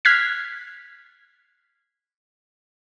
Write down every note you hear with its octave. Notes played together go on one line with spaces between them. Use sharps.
F6 F#6 G#6 B6 C7